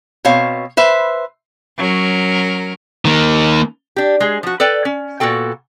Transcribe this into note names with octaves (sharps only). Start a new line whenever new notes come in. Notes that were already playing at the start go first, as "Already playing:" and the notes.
B2 C4 C#5 F5
B4 C5 E5
F#3 C#4 A#4
D#3 A#3
D4 G4
G#3 G#4
F3 F#4
A4 B4 D5 G5
C#4
A#2 B3 F#4 A4 G5